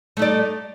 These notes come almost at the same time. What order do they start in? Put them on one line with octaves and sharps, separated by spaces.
A3 D#4 D5